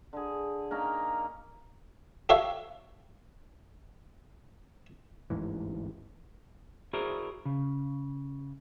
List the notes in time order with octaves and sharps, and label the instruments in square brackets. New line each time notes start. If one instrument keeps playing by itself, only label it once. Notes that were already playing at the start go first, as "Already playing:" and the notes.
[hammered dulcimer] D3 G#4
A#3 C#4 D#4 A#4
[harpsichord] G4 A4 C#5 E5 F5
[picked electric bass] G1 D2 G#2 E3
[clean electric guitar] E4 F#4 G#4 A#4 C5 D5
C#3